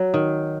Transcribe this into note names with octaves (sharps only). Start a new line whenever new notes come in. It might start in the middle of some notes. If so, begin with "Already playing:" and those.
Already playing: F#3
D#3